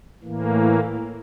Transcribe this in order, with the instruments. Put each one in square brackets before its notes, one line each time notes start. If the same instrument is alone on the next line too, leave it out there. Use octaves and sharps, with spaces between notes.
[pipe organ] A2 E3 A#3